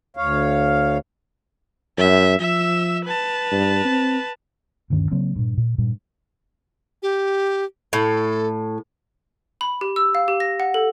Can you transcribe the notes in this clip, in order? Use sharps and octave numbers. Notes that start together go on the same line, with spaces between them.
D2 C#5 F5
F#2 E5
F3 E5 E6
B4 A5
G2
C4
D2 G2 D#3 C#4
C#3 F#3 A#3 C4
G2 A#2
A#2
G2 A#2 G3
G4
A2 A4
B5
G4
E6
F5
G4
A#6
F#5
A4